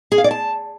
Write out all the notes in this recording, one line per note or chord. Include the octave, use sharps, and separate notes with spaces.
G#4
F5
D5
A5